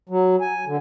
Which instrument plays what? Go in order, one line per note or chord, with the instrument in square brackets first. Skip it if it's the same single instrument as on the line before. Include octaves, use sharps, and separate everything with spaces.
[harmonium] F#3
G#5
D3